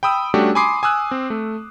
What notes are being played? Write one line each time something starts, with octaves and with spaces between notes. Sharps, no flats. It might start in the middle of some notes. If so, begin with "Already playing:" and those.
G5 B5 D#6 E6
G3 A3 C#4 D4 F#4 G4
G#5 B5 C6 D6 D#6 C7
G#5 D#6 E6 F#6
C4
A3